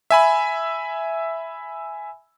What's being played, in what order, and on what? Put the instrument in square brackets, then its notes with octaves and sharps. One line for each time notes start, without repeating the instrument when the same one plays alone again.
[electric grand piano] E5 G#5 B5